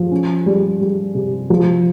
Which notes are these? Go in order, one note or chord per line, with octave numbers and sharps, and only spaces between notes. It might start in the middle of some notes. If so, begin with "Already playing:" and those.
Already playing: F3
C#4
G3
G3
C3
F3